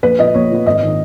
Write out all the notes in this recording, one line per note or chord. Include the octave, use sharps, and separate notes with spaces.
A#1 B4
A#2 F3 B3 D#5
A#1 C#5
A#2 F3 B3
G#1 D#5
D#3